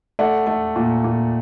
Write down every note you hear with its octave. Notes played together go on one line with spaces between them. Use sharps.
A3 D5 F#5
A3
A#2
A#2